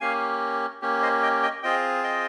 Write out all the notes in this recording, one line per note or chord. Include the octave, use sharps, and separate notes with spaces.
A#3 C#4 G4 F5 G#5
A#3 C#4 G4
C5 D#5
D#5 G5
D#5 G5
C4 F4 G#4 D#5 G5
D#5 G5